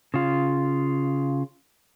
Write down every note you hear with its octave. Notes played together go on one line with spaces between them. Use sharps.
C#3 F4